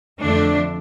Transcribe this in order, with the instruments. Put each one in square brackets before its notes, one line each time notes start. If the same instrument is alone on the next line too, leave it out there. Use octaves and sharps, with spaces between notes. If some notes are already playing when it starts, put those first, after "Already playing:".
[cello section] F2 D3 F3 A3 D4